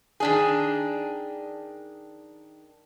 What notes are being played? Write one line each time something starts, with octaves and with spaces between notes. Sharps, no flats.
D#3 D4 G#4